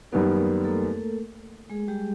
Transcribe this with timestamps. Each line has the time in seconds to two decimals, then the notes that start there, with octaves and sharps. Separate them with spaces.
0.12 F#2 D#3 G3 A#3 B3 A#4
0.64 A3 A4
1.70 G#3 G#4
1.88 G3 G4